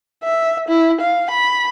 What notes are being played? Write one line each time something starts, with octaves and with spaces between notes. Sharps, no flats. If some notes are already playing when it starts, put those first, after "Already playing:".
E5
E4
F5
B5